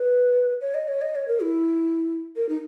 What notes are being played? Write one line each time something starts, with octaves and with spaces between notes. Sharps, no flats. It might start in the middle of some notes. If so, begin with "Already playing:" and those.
Already playing: B4
C#5
D#5
C#5
D#5
C#5
A#4
E4
A#4
D#4